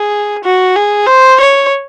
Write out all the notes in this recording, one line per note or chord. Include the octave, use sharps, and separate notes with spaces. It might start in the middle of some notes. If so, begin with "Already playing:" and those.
Already playing: G#4
F#4
G#4
C5
C#5